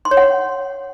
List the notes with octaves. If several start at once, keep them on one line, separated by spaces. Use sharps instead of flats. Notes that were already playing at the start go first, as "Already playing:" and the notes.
C6
C#5
F#5